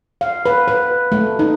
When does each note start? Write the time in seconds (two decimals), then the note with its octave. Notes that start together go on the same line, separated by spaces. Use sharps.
0.21 F5
0.46 B4
0.68 B4
1.12 A3
1.39 D#4